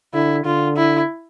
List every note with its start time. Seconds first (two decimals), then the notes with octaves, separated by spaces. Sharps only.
0.14 D3 E4
0.45 D3 F4
0.77 E4